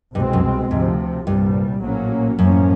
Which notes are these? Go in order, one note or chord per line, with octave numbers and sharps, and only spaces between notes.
C2 G2 B2 G#3 C4
F#2
D2 G#2 C3 F3
C2 G2 A#2 G3
A#1 A2 F#3 A#3 C#4
A1 F#2 A2 F3 A#3 C#4